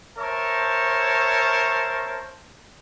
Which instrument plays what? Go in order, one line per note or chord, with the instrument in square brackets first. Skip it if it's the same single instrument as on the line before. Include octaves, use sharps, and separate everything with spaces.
[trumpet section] A#4 C5 C#5 E5 A5